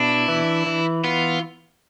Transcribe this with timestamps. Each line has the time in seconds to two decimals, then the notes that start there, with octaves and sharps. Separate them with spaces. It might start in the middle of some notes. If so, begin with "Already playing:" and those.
Already playing: B2 D4 E4
0.28 E3
0.66 E3
1.04 B3 F4